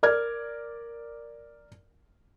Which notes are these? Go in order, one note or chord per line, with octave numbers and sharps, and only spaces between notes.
A#4 D5 F6 G#6